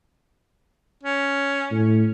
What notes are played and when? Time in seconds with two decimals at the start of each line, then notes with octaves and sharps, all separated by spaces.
1.03 C#4
1.71 A2